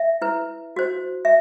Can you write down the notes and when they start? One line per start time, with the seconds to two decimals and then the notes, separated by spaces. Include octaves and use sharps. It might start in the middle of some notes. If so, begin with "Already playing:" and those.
Already playing: E5
0.22 E4 B4
0.76 F#4 C5
1.25 E5